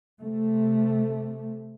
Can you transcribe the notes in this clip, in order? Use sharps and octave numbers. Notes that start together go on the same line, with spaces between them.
C3 A3